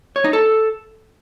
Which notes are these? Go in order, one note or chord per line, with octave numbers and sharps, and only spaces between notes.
C#5
D#4
A4